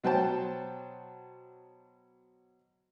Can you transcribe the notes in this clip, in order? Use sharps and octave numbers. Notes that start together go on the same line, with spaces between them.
B2 F#3 C5 G5 A5